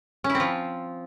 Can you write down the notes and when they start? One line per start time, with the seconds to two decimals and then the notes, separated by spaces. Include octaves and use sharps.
0.24 C#4
0.30 E4
0.35 C4
0.40 F3